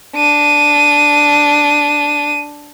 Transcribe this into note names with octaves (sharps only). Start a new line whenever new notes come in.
D4 D#7